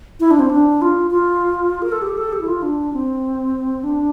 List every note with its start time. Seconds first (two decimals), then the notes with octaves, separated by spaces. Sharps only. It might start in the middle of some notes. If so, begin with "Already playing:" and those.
0.20 E4
0.31 D4
0.39 C4
0.50 D4
0.82 F4
1.11 F4
1.82 A#4
1.92 A4
2.02 G4
2.17 A4
2.33 G4
2.41 E4
2.48 F4
2.62 D4
2.93 C4
3.84 D4